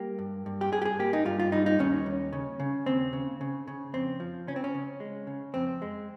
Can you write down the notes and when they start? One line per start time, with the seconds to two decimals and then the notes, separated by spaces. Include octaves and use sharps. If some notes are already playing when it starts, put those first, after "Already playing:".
Already playing: G3 A#3 G4
0.19 G2
0.46 G2
0.61 G4
0.72 G2 G#4
0.82 G4
0.85 G#4
0.99 A#3 G4
1.13 D#4
1.25 G2 F4
1.40 F4
1.52 G3 D#4
1.66 D#4
1.79 D#2 C#4
2.06 D#2
2.33 C#3
2.60 C#3
2.86 D#2 C4
3.13 C#3
3.41 C#3
3.68 C#3
3.93 F2 C4
4.20 F3
4.47 C#3 C#4
4.56 C4
4.64 C#4
4.75 C#3
5.00 G#3
5.27 C#3
5.54 F2 C4
5.82 G#3